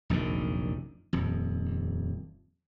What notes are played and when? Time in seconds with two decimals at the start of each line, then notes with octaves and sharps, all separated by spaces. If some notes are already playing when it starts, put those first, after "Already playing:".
0.10 F1 A#1 F#2 D#3
1.13 D#1 F2